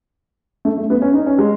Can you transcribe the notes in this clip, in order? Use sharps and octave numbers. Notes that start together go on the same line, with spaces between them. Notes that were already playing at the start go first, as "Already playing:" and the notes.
A3
A3
B3
C#4
D#4
C#4
G#3